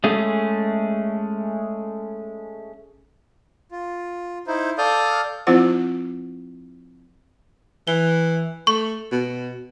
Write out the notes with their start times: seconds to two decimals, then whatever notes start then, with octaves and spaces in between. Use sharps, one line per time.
0.04 G#3 A3 C#4 G#4
3.72 F4
4.47 D#4 E4 C5
4.78 A4 D5 F5 D#6 F6 G6
5.47 F3 C4 E4 F4 C5 F#5
7.87 E3 G7
8.67 A3 C#6
9.12 B2